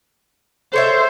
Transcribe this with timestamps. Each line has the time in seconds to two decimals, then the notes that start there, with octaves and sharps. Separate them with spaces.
0.73 A4 C5 C#5 E5